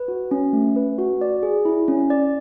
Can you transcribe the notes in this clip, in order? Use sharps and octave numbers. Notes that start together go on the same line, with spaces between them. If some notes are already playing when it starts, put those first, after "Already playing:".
Already playing: B4
F#4
C#4
A3
B4
F#4
D5
G#4
E4
C#4
D5